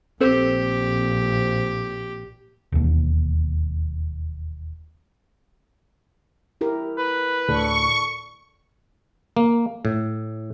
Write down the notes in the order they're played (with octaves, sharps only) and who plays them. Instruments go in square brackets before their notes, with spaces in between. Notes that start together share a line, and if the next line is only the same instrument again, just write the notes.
[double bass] A#1 [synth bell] C4 A4 C5 [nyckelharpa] G4
[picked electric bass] E1 D#2
[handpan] E4 G4 A#4
[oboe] B4
[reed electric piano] D2 A2 [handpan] A4 D5 [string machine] C#6
[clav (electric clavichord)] A#3
A2